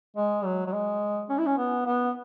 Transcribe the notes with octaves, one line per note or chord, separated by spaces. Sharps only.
G#3
F#3
F#3
G#3
C#4
E4
C#4
B3
B3